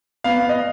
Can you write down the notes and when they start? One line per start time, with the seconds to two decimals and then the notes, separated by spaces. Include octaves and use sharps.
0.24 B3 F5
0.49 D#5